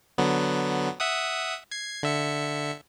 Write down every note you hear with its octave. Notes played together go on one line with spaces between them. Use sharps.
D3 F#3 B3
E5 F#5 D#6
G#6 C7
D3 E5 C#7